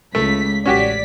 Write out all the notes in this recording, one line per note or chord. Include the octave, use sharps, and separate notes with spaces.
C#2 A3 B6
A1 C#4 F#4 G4 D5 B6